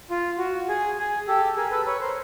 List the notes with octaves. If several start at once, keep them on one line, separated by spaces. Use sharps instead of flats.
F4
F#4
G#4
G#4
G4 A4
G#4 A#4
A4 B4
B4 C#5
A#4 C5